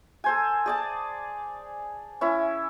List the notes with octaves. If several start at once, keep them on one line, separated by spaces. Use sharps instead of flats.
A4 C5 G#5
G#4 D5 A5
C#4 E4